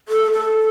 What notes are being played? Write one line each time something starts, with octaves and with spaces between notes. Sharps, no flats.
A4
A4